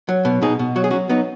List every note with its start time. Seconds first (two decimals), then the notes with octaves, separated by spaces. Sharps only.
0.09 F#3
0.25 B2
0.42 B2 D#4 G#4
0.59 B2
0.76 F#3 F#4
0.84 G#4
0.91 F#3 C#4 F#4
1.10 F#3 B3 D#4